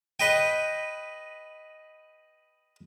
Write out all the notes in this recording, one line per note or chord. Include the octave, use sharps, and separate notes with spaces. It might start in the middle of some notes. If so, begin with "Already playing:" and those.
B4 D#5 G5